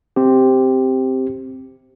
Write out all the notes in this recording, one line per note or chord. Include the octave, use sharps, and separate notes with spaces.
C4 G4